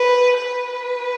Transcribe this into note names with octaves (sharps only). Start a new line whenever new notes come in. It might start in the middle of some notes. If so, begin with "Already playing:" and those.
Already playing: B4
B4